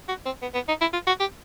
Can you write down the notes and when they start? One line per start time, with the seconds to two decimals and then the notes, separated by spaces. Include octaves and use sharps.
0.08 F#4
0.25 C4
0.42 B3
0.55 B3
0.69 D#4
0.81 E4
0.93 F4
1.07 F#4
1.20 G4